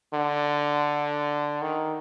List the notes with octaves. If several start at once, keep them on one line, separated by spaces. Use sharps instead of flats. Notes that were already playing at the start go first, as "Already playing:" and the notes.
D3
D#3